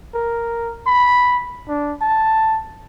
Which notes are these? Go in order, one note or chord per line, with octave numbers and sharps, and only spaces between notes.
A#4
B5
D4
A5